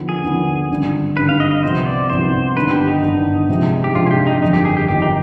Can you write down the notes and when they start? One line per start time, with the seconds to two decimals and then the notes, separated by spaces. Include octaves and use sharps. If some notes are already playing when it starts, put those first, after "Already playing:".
Already playing: D#2 D3 F3 B3
0.09 G#4
0.24 D#2 D3 F3 B3
0.70 G#1 G2 D3 G3
1.16 G#1 G2 D3 G3 B4
1.29 F5
1.40 D#5
1.51 D#5
1.63 C2 C3 F3 B3 C5
1.86 D5
2.10 C2 C3 F3 B3 C5
2.56 G1 G2 D#3 B3 D4 B4
2.71 G4
2.87 D#4
3.02 G1 G2 D#3 B3 D4
3.49 C3 F3 G#3 D4
3.84 G4
3.95 C3 F3 G#3 D4 F4
4.07 G#4
4.11 G4
4.27 D#4
4.42 G1 F2 D#3 D#4
4.53 G4
4.65 G#4
4.77 G4
4.88 G1 F2 D#3 G4
5.02 D#4